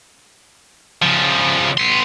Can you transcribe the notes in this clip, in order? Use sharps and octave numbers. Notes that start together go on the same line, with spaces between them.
C#3 F3
B3 C6